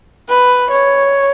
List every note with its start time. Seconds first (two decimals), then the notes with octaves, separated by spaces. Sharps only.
0.29 B4
0.70 C#5